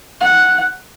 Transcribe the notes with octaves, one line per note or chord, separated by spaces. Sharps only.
F#5